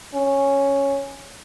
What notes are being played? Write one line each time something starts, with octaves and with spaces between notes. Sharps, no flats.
C#4